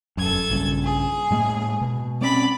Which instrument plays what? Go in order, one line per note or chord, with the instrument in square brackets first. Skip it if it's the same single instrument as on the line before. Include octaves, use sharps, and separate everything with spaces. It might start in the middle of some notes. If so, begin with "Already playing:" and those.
[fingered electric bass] E1 F#2 [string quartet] A4 G#6
[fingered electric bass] A#1 G2 C#3
[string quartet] G#4
[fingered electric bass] A2 G#3 A#3
B2
[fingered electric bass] G#3 C4 C#4 [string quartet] D5 B5